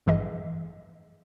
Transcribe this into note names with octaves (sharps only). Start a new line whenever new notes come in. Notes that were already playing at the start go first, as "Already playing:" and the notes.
A1 G2 E3 G#4 D#5